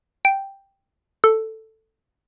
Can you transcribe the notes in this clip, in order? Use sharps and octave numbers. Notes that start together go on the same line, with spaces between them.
G5
A4